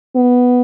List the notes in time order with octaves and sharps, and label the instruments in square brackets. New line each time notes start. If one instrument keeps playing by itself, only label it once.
[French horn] B3